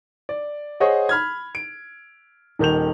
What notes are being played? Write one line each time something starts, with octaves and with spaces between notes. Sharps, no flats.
D5
G#4 C5 C#5 D#5 F#5
B5 F6 G#6
D7
D#1 D#3 G6 F7